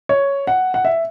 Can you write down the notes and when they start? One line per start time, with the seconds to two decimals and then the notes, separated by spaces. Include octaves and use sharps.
0.09 C#5
0.47 F#5
0.74 F#5
0.85 E5